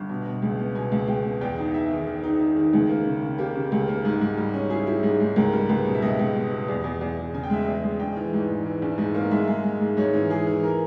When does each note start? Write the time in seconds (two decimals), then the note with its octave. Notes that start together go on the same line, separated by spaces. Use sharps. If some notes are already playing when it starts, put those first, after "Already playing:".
Already playing: G1
0.09 B2
0.26 B2
0.42 C#2
0.59 B3
0.75 B2 G#5
0.92 C#2
1.08 C#2 G5
1.25 B3
1.41 E2 G5
1.58 D#4
1.74 D#4 E5
1.91 D#3
2.07 D#3
2.24 D#4
2.40 D#4
2.56 D#3
2.73 C#2
2.89 A#3
3.06 C#3
3.23 C#3
3.38 A#3 G4
3.55 C#3
3.72 C#2
3.88 A#3
4.05 G#2
4.21 G#2
4.37 G3
4.54 C#4
4.70 E4 G#4
4.87 E4
5.03 G#2
5.20 G#2
5.36 C#2 A#4
5.53 G3
5.69 C#2 B4
5.85 B2
5.95 E5
6.02 C#2 D#5
6.19 C#2
6.36 B3
6.51 B2
6.68 E2
6.84 E2
7.01 E2
7.18 E2
7.33 C#3 G#5
7.44 G5
7.50 G#3 E5
7.63 E2 G5
7.83 G#3
8.00 A#1 G5
8.17 E3
8.33 G#2
8.49 E3
8.66 E3
8.82 A#1
8.98 G#2
9.15 A#3
9.31 G#3 E5
9.48 G#3
9.64 G#3
9.81 G#2
9.97 G#2 C#5
10.13 E3
10.30 E3 G#4
10.47 E3
10.64 A#4